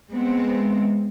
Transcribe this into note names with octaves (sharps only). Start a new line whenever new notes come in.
G#3 B3 C4